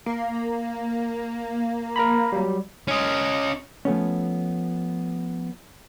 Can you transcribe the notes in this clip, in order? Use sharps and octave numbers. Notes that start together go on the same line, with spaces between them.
A#3
A#4 A#5 B5
F#3 G3
C#4 D#5
F3 A3 B3 C#4